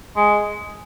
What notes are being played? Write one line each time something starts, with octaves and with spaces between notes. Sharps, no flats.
G#3